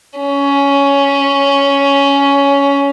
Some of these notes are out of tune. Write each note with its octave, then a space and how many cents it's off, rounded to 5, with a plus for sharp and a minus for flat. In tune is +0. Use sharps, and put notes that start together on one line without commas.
C#4 +10